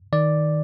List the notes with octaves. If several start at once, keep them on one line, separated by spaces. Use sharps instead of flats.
D#3 D5